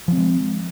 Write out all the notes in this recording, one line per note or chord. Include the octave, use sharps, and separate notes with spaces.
F3 G#3 C4